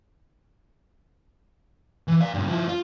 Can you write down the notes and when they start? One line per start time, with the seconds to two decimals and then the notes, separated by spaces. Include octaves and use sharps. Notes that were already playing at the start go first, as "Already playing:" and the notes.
2.08 E3
2.21 D5 F5
2.34 G2 C#3
2.48 F3 E4
2.68 F4